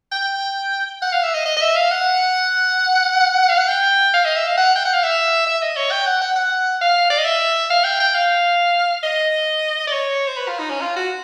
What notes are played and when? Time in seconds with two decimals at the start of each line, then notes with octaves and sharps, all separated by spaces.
0.12 G5
1.02 F#5
1.12 F5
1.23 E5
1.34 D#5
1.46 D#5
1.57 D#5
1.61 E5
1.75 F5
1.91 F#5
3.49 F5
3.58 F#5
3.68 G5
4.14 F5
4.25 D#5
4.36 E5
4.47 F5
4.57 F#5
4.75 G5
4.85 F#5
4.93 F5
5.03 E5
5.47 E5
5.62 D#5
5.76 C#5
5.91 G5
6.07 F#5
6.21 F#5
6.36 F#5
6.81 F5
7.10 D5
7.18 D#5
7.25 E5
7.70 F5
7.84 G5
8.00 G5
8.15 F5
9.03 D#5
9.87 D5
9.92 C#5
10.27 C5
10.37 B4
10.48 F4
10.59 D#4
10.70 C#4
10.81 F4
10.96 F#4